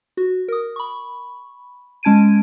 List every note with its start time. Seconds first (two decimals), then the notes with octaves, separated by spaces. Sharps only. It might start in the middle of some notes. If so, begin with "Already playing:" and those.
0.17 F#4
0.48 A#4 D#6
0.76 B5 C#6
2.03 G#3 C#4 A5 G#6 D7 D#7